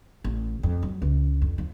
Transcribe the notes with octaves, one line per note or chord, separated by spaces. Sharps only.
A1
F2
F#3
C#2
F2
F3